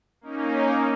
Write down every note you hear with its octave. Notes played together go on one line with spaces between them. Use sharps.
A#3 C#4 D#4